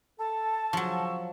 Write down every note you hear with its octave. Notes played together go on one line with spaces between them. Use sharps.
A4 A5
C#3 F3 F#3 C#6 E6